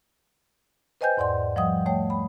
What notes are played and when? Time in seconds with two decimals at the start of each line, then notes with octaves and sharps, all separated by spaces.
1.01 B4 C5 D#5 G5 G#5 G6
1.17 E2 G#2 D5 F#5 C6
1.56 F3 G3 D#5 F#5 D#6
1.86 A3 C#5 G5
2.10 B5